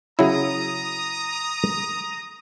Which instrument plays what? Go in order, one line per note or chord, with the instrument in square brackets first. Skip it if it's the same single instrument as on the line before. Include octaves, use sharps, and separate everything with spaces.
[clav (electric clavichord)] C#3 F#3 E4 [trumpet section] A#5 D#6